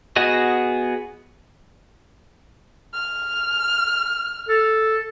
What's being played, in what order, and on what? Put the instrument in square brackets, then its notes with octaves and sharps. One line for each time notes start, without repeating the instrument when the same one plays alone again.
[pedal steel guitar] B3 F#4 G#4 D#5
[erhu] F6
[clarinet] A4